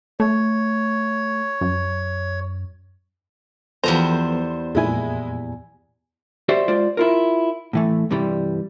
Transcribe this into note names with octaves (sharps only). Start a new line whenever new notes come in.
A3 C#5
F#2
E2 F3 G3 B3 A4 C5 A#5
F2 A#2 G#3 E4 G#5
F#4 G4 C5 D5 E5
G#3 F4 C5 D5
E4 F4 A#4
A2 E3 A3
G2 C3 E3 G3